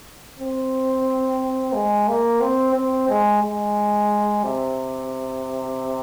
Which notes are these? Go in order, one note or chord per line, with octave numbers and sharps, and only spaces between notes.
C4
G#3
A#3
C4
C4
G#3
G#3
C3